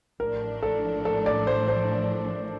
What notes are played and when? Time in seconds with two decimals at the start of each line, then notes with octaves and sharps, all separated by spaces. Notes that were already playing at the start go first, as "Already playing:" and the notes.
0.20 A1 A2 F3 A3 D4 A#4
0.63 A4
1.05 A4
1.26 D5
1.47 C5
1.68 C5